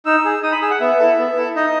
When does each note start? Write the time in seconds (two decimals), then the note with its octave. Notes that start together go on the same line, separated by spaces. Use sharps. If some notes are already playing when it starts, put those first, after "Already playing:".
0.06 D#4 E6
0.25 G#4
0.43 D#4 D#6
0.52 B5
0.61 G#4 E6
0.71 F#5
0.81 B3 E5
0.99 E4 A4
1.18 B3
1.37 E4 A4
1.56 D#4 D#5